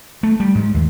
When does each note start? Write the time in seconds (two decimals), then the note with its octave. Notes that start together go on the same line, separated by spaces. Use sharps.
0.23 A3
0.40 G3
0.55 G#2
0.74 D#2